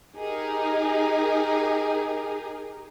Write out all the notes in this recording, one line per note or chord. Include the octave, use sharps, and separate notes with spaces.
D#4 G4 G#4 A#4